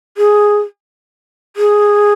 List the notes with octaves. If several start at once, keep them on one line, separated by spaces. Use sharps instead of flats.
G#4
G#4